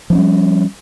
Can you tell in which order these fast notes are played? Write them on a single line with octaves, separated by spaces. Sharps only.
F3 D4 C#4 G3